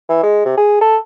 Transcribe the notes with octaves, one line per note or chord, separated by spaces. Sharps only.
E3
G#3
C3
G#4
A4